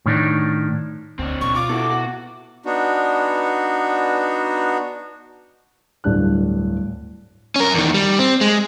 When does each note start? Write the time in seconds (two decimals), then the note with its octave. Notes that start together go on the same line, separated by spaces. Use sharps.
0.06 A2 D#3 D4
1.19 D2 C4 D4
1.41 B2 C#6
1.55 F4 D6
1.69 B3 E4 F#4 A4
1.91 F#4
2.65 B3 D4 D#4 F#4
6.04 D1 G2 D4 F#6
7.56 C#4 A#4
7.74 E2 D#3
7.94 G3
8.19 C4
8.41 G#3